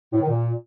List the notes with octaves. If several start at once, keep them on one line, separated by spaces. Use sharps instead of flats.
A2
D#3
A#2